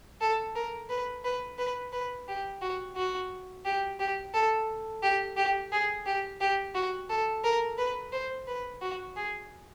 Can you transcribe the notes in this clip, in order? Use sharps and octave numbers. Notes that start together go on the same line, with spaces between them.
A4
A#4
B4
B4
B4
B4
G4
F#4
F#4
G4
G4
A4
G4
G4
G#4
G4
G4
F#4
A4
A#4
B4
C5
B4
F#4
G#4